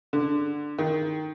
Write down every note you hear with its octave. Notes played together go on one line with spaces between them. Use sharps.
D3
D#3